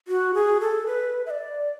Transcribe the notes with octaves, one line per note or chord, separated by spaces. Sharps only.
F#4
G#4
A4
B4
E5
D5